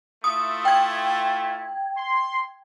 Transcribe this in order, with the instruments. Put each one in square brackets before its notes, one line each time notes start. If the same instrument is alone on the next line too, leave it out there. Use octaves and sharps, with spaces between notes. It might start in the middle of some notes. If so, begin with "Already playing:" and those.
[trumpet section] A3 E4 F4 [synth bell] D#6
[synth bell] G5 G#6
[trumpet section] C6